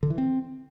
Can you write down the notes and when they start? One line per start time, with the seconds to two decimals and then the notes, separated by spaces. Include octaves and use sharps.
0.03 D3
0.10 E3
0.18 C4